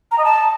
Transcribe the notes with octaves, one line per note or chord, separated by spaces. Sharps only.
A#5
D#5
A5